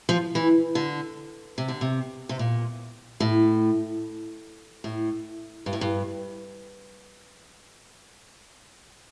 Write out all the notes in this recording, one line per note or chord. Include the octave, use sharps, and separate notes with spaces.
F3
E3
D3
C3
D3
C3
C3
A#2
A2
A2
G2
A2
G2